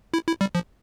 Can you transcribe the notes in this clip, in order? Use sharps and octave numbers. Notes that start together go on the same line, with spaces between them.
E4
E4
G3
F3